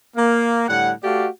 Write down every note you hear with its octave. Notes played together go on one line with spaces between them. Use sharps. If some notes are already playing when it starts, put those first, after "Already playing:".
A#3
A2 D3 G3 F#5
A3 F#4 G4 D5 F5